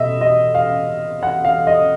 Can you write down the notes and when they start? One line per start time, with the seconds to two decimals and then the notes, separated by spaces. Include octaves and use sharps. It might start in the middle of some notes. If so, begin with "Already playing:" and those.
Already playing: B2 D#5 E5
0.21 D#5
0.55 F5
1.23 F#5
1.45 F5
1.67 D#5